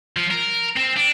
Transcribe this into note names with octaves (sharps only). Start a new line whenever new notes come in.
F3
A#4
C4
D4